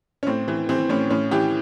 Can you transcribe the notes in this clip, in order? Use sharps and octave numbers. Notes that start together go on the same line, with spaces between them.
C#4
A2 C4
E3
E3 C4
A2 C#4
A2 C#4
E3 G4